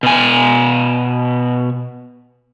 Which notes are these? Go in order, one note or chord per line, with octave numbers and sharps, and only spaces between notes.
B2 G#5